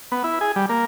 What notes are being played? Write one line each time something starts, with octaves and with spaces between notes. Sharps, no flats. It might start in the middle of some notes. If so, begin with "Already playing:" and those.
B3
E4
G#4
G3
A#3